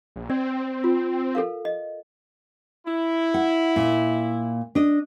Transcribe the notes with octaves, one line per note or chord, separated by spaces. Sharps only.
A#1
C4 D5
F4
A4 A#4 F5
D#5
E4
F#5
A#2
D4 D#5